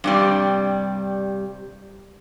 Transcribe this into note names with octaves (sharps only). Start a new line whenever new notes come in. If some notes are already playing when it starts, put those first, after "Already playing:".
G2 C3 G3